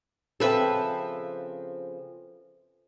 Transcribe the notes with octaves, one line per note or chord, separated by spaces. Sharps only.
C#3 F3 C4 A4 B4 E5